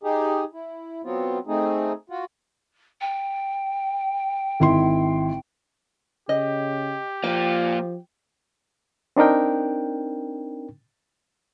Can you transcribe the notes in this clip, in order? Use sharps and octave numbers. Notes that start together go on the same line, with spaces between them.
D#4 G4 G#4
E4
F#3 B3 C4 F4
A3 C4 D#4 G#4
F4 F#4
G5
G#1 E4 C6
C#3 G4 D#5
F3 A#3 F4 G5
C4 D4 D#4 A#4 G5